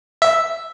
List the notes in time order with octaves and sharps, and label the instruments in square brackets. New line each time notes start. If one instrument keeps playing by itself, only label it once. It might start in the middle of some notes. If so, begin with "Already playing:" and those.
[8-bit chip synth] E5